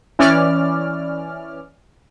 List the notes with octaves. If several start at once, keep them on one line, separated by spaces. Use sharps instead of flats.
E3 C#4 D5 F6